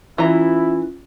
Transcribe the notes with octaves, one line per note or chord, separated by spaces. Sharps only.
E3 C#4 E4 F4 A#5